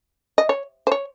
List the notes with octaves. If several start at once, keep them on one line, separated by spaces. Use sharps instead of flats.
D#5
C#5
C5
C#5